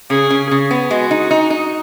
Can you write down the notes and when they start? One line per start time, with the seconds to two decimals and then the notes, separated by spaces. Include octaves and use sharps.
0.10 C#3 G#4
0.30 C#3
0.50 C#3 G#4
0.71 B3
0.91 G#3 F#4
1.11 D#4
1.31 D#4
1.50 D#4